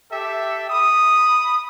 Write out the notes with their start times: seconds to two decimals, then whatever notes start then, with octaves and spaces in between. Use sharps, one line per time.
0.11 G4 A4 E5
0.69 B5 D#6